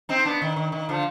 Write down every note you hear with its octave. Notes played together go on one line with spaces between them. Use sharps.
C4 D#4
B3 D4
D#3
D#3
D#3
D3 F3